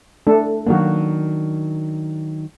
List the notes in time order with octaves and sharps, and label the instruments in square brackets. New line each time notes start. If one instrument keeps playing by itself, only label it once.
[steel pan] A3 D4 A4
[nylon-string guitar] D#3 F#3 D4 [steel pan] A#3 F#4